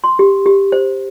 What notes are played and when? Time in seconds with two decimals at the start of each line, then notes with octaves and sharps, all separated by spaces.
0.04 C6
0.19 G4
0.46 G4
0.72 C5